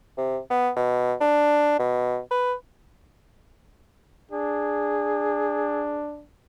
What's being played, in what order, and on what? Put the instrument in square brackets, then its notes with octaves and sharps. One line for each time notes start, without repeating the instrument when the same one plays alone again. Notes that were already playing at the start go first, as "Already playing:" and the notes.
[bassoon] C3
B3
B2
D4
B2
B4
[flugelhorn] D4 [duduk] G#4